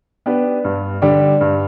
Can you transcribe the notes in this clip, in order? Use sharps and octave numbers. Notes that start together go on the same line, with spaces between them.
B3 D4 G4 B4
G2
D3 G3 D4 G4
G2